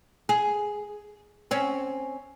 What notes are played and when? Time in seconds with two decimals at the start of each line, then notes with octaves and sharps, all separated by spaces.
0.29 G#4
1.51 C4 C#4